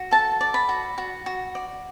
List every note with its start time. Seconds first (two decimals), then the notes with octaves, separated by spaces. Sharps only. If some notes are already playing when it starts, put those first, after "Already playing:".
Already playing: F#4
0.11 A4 A5
0.41 D5
0.54 B5
0.69 F#4
0.98 F#4
1.26 F#4
1.55 D5